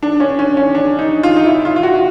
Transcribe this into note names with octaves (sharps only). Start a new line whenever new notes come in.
D4
C#4
C#4
C#4
D4
D#4
F4
D#4
E4
F4
F4
F#4